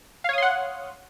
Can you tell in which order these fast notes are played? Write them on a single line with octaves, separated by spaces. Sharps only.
F5 C#5 D#6 C6 F#5